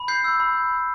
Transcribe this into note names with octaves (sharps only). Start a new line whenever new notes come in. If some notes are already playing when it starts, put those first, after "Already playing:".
Already playing: B5
G6 C7
E6
B5